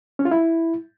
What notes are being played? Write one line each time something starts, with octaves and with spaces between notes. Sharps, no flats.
C#4
F4
E4